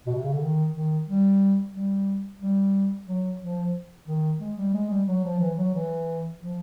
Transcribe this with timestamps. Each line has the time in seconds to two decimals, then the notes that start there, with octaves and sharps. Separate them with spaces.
0.07 B2
0.16 C3
0.24 C#3
0.33 D3
0.42 D#3
0.75 D#3
1.08 G3
1.75 G3
2.41 G3
3.08 F#3
3.41 F3
4.08 D#3
4.40 G#3
4.57 G3
4.74 G#3
4.90 G3
5.07 F#3
5.24 F3
5.40 E3
5.57 F#3
5.74 E3
6.40 F3